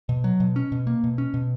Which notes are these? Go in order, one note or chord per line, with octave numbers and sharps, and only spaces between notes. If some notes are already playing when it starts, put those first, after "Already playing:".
B2
F#3
B2
C#4
B2
A#3
B2
C#4
B2